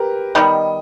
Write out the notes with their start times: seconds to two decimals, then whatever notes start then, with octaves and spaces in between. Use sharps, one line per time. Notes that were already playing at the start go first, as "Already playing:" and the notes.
Already playing: G4 A#4 B4
0.35 D#3 G3 B3 D#5